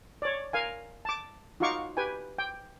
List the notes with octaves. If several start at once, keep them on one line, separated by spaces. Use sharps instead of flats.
C#5 D5
A#4 F5 G#5
A5 D6
D#4 F4 F#4 F5 C#6 D6
G4 B4 G5 G#5
G5